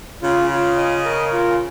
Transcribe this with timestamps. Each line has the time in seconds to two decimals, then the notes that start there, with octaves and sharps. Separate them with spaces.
0.22 C#3 F4
0.49 F4
0.77 D#5
1.05 A#4
1.33 F4